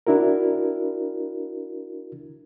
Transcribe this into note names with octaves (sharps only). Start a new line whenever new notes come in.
D4 E4 F#4 A#4